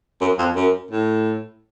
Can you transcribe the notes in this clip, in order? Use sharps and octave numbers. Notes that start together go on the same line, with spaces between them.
F#2
F2
F#2
A2